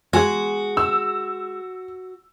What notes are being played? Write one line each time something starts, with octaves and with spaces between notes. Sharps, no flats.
G#3 F#4 G#4
E6